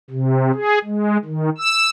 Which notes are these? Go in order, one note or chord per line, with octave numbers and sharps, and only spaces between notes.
C3
G#4
G#3
D#3
E6